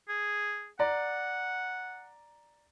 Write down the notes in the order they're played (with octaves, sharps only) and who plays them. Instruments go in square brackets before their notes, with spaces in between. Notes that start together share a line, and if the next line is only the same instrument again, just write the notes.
[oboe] G#4
[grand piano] D5 A#5 [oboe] F#5